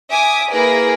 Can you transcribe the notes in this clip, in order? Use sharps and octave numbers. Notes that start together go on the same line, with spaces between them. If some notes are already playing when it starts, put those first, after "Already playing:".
E5 G#5 D6 D#6
A#3 E4 G#4 A#4 B4